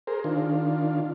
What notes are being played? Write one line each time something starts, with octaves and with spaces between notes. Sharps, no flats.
G#4 A#4 C5
D#3 D4 F4